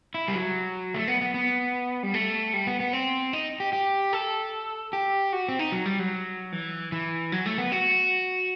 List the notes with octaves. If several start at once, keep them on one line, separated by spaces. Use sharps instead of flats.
E4
G3
F#3
A3
B3
B3
B3
G3
A3
G3
B3
B3
C4
D#4
G4
G4
A4
G4
F#4
C4
D#4
F#3
G3
F#3
E3
E3
F#3
A3
B3
F#4